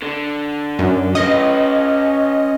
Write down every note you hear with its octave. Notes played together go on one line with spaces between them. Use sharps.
D3
F#2
C#4 B4 D#5